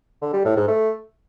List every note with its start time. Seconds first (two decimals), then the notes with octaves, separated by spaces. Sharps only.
0.21 D3
0.33 G3
0.45 A2
0.56 G#2
0.68 A3